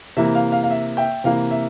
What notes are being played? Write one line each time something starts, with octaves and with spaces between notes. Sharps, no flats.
C3 E3 A#3 E5
F5
F5
F5
E5
E5 G5
C3 E3 A#3 F5
E5